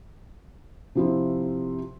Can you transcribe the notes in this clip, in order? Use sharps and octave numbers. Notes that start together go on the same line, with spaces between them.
C3 F3 E4